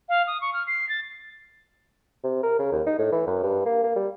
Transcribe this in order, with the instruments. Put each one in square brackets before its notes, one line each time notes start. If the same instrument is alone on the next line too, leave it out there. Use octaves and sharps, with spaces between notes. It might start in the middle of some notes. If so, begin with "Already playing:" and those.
[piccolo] F5
D#6
C#6
F6
C7
A6
[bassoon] C3
A#4
C#3
D#2
D#4
A2
E3
F#2
G2
A#3
A#3
G3